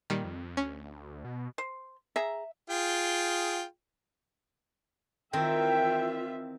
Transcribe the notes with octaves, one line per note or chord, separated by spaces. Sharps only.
A#2 D#3 G3
F2
D2 C#4
B2
C5
G#4 E5 A#5
F4 G#4 G5
D#3 E3 C4 F4 E5 G5